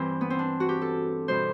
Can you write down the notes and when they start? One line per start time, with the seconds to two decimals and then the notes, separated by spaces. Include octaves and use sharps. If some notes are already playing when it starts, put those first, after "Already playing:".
Already playing: G2 E3 G3 C4
0.21 B3
0.30 C4
0.39 D4
0.60 F#4
0.69 G4
0.81 A4
1.28 B2 G3 C5